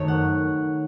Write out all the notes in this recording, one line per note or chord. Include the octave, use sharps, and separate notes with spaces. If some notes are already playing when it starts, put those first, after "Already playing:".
Already playing: F#2 D#3 F#3 A3 C#5
F#5